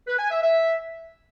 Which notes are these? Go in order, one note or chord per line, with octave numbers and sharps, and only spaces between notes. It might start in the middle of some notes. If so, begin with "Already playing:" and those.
B4
G#5
E5
E5